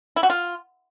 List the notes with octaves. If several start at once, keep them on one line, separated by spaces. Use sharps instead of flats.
E4
F#4
F4